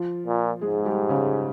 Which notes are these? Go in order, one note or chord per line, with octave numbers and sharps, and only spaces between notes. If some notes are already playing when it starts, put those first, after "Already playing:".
Already playing: F3 F4
A#2
G#2 G#3 G#4
G3 G4
C#3 C#4